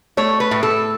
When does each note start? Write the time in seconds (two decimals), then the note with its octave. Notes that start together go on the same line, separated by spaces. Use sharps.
0.17 A3 C#5
0.40 B4
0.51 A2
0.63 A4